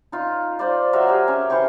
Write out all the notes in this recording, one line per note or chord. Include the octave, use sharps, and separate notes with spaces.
D#4 F4
F4 C5 D5
F#3 A#4 E5 C6
G4 G#4
C#4
E3 C5 G5 C#6